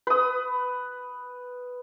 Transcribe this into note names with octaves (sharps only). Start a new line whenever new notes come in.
B4 D#6